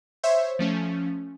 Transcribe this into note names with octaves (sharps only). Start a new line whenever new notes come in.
C5 C#5 E5
F3 A3 C#4